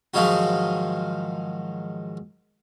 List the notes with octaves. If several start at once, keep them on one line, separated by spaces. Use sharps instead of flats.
G#2 D#3 F3 F#3 D#4 F#4